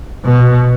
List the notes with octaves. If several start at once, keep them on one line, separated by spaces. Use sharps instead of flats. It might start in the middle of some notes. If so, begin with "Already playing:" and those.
B2